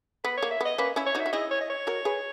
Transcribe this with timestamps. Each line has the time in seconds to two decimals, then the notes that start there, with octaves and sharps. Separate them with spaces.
0.24 B3 B4
0.37 C#5
0.42 A#3
0.51 E5
0.61 B3 D#5
0.78 A#3 C#4 B4
0.96 C#4 E4
1.06 C#5
1.15 D#4 F#4 E5
1.26 F#4
1.33 E4 G#4 D#5
1.51 C#5
1.61 D#5
1.70 C#5
1.87 F#4 A#4
2.05 G#4 B4